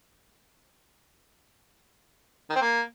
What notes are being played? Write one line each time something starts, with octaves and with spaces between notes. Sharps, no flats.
D#3
C4
A#3